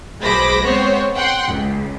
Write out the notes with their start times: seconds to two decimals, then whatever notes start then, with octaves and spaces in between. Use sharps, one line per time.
0.24 B1 G#3 C5 B5 D6 A#6
0.65 G#3 B3 C4 C5 C#5
1.15 F#5 G5 C6
1.47 C#2